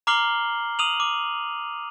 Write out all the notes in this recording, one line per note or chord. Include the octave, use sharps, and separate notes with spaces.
A#5 D6 F6 C7 F#7 G7
D#6 D#7 F7 F#7
D6